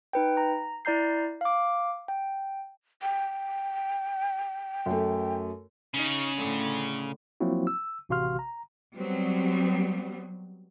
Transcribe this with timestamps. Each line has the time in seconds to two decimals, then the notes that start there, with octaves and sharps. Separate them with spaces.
0.13 D#4 B4 G5
0.37 A#5
0.85 E4 D5 A#5 G6 C7
1.41 F5 D6
2.08 G5
3.02 G5
4.86 F#2 A3
5.94 C#3 D#4
6.36 A2 D3
7.40 F3 F#3 A#3 C4 E4 F#4
7.67 E6
8.09 A1 C3 F#4 F5 C6 F6
8.39 A#5
8.95 F#3 G3 B3 C4